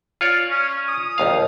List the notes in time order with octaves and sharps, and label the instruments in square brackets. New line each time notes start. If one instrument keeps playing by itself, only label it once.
[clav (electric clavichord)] F4 C#5 D5
[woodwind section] C#4
D#6
[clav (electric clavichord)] A#1 D#2 F5